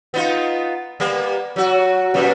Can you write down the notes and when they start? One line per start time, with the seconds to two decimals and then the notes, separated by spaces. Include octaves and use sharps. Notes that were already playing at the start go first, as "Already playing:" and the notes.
0.14 B3 D#4 F4
1.00 G3 A#3 B3
1.56 F#3 F#4
2.14 F#2 A#2 G3